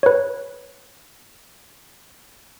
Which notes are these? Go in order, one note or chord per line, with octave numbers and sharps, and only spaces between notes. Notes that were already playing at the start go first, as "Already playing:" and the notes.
B4 C#5